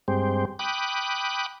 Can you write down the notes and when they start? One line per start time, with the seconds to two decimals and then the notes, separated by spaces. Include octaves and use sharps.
0.08 G2 G#3 C4 G4 C5
0.59 G5 B5 D6 D#6 F#6